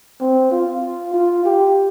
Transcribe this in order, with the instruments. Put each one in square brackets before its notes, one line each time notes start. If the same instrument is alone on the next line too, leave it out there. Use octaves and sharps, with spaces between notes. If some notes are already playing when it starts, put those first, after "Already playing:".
[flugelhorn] C4
F4
F4
G4